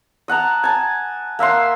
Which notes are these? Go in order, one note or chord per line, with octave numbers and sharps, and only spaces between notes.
D#5 F#5 A5 A#5
G#5 A5
A#3 E5 F#5 C6